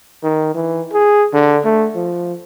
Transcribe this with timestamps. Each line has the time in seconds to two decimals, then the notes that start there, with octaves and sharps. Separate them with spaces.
0.23 D#3
0.55 E3
0.93 G#4
1.34 D3
1.65 A3
1.95 F3